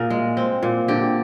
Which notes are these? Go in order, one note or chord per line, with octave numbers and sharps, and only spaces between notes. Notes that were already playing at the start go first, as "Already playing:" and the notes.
Already playing: A#2 G#4 A#4
G#3
C4
A#2
D3 G4